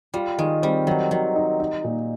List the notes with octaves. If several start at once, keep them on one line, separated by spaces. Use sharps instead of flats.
G3 F4
D#3 G#3
G3 C4
D#3 F#3
D#3 F#3
D#4
D#4
A#2